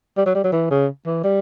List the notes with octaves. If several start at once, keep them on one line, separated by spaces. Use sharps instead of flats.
G3
F#3
G3
F#3
E3
C#3
E3
G3